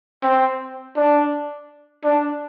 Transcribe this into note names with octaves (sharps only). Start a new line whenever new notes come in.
C4
D4
D4